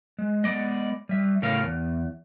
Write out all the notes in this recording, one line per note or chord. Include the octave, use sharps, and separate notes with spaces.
G#3
G#3 B3 D5 D#5
G3 E5
A2 C#3 A#4 F5
E2